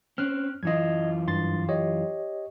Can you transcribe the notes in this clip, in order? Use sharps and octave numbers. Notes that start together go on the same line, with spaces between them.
C4 C#4 F6 F#6
F#2 E3 F4 D#5 G#6
G2 C6 A6
G4 C#5 D#5